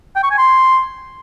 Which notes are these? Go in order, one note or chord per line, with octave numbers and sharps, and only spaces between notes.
G5
C#6
G#5
C6